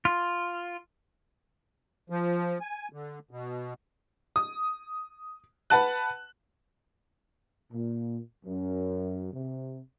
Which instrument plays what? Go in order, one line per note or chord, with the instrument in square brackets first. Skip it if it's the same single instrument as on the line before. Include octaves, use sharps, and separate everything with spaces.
[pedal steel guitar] F4
[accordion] F3
G#5
D3
B2
[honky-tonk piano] D#6
B4 F#5 A5 F#6
[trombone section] A#2
F#2
C3